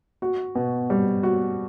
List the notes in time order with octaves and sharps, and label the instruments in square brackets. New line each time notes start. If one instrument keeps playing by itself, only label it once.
[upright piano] F#4
B2
G3
F#4